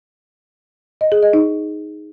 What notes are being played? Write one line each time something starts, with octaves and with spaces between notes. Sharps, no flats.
D#5
G#4
D#5
D#4